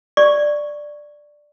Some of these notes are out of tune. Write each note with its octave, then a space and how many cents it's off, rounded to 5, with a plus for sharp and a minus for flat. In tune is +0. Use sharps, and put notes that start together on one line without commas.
D5 +5 C#6 +0